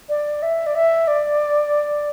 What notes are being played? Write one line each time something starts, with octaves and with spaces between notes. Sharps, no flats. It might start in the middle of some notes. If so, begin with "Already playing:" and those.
D5
E5
D5
E5
D5